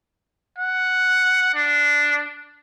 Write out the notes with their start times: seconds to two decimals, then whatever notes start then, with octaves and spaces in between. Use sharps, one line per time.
0.58 F#5
1.55 D4